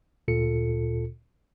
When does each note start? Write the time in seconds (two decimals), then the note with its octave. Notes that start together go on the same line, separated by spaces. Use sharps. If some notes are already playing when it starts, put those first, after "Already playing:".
0.28 D2 A#2 F4 A4 C#7